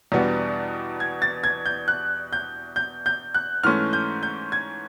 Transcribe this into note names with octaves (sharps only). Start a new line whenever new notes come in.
E2 B2 G3 B3 D4
G#6
A6
G#6
G6
F#6
G6
G6
G6
F#6
G#2 E3 A3 C#4 F6
G6
G6
G#6